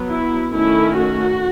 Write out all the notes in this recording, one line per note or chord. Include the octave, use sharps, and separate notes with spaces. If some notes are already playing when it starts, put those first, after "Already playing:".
Already playing: F#3 B3
E4
D#3 A3 C#4 E4
F#4